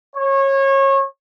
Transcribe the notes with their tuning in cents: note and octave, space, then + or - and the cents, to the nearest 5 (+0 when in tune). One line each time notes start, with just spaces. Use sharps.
C#5 -25